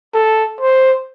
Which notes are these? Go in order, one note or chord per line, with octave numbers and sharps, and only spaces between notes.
A4
C5